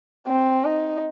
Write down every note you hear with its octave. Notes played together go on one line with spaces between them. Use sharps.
C4
D#4